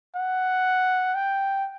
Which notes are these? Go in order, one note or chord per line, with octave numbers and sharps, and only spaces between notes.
F#5
G5